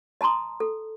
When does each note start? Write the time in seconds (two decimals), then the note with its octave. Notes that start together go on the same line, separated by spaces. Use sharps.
0.21 D#5 A5 A#5 C6 D#6
0.60 A4